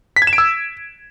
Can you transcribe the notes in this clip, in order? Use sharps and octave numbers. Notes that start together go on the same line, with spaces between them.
B6
G#6
E7
D7
E6